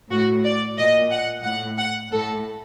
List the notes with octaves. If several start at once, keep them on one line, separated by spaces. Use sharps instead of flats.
A2 F#4
D5
A#2 D#5
F#5
A2 F#5
F#5
A2 A4